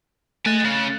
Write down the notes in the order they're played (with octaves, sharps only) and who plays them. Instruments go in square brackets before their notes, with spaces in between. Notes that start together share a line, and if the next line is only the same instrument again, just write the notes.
[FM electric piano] A3 F#6 A6 [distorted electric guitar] D#5 G#5
[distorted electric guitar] C#3